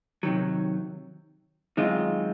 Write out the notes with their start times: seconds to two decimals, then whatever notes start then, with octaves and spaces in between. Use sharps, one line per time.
0.23 C3 D#3 F#3
1.77 F#2 D#3 G#3 C4 F4